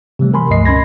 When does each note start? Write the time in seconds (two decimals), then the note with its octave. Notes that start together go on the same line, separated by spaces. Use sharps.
0.19 C3 E3 G3 A3
0.34 A#4 G#5 B5 C6
0.49 C#2 G2 F3 A3 D#5 C7
0.65 B2 C#4 B5 G#6 A#6